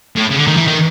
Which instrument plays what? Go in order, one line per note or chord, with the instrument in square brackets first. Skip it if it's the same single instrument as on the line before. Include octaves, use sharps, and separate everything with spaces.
[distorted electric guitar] A2
C#3
D3
D#3
E3
D#3